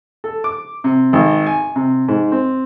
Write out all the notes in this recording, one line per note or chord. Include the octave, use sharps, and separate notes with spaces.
A4
D6
C3
G#1
G#5
C3
G#2
C4